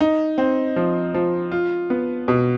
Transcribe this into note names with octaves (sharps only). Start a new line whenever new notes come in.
D#4
C4
F3
F3
F4
B3
B2